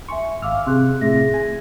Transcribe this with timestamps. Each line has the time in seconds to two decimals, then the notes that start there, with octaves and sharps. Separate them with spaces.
0.08 E5 G#5 C6 C#6
0.42 G#1 F5 D6 E6 F6
0.67 C3 G#4 C6 F#6
1.01 A2 C3 G#4 E5 A#6
1.34 G#5